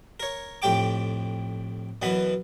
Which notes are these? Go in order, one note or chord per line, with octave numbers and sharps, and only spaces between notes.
A#4 C#5
F2 A2 G4 G5 D6
F#2 B2 E3 B3 B5